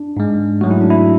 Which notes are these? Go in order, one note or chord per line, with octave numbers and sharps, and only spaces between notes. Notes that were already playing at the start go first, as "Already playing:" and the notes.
Already playing: D4
G#2 G#3
G#2 F#3 A3 F#4
E4
D4
E4